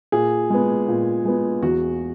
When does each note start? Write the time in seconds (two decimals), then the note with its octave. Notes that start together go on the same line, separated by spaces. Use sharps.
0.12 A#2 G#4
0.50 G#3 B3
0.88 A#2
1.25 G#3 B3
1.62 E2 F#4